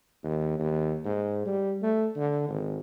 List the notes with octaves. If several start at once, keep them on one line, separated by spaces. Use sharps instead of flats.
D#2
D#2
G#2
G3
A3
D3
G#1